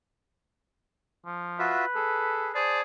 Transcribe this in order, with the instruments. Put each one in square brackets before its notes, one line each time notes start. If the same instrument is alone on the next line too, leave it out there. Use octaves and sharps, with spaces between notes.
[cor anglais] F3
[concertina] F4 F#4 E5 [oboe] B4
[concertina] G#4 [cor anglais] A4
[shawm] G#4 [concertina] C5 D5 A5